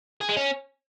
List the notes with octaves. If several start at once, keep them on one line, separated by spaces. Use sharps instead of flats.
G#4
G#3
C#4